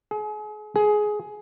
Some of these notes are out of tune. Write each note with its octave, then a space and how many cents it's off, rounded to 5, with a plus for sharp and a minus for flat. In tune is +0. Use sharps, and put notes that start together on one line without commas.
G#4 +35
G#4 +15